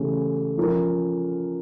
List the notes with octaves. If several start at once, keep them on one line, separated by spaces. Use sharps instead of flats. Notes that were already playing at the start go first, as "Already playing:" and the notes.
Already playing: C#3 E3 A3 C#4 G4
F3 C#4 F4 A#4